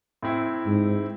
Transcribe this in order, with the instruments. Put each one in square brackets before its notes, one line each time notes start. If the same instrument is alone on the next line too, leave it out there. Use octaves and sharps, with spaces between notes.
[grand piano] A2 C4 E4
[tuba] G#2